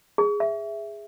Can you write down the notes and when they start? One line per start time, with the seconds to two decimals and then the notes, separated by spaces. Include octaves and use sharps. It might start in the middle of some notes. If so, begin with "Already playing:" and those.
0.18 G#4
0.40 E5